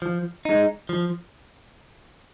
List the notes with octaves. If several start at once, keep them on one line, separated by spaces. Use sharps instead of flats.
F3
G#3 D#4
F3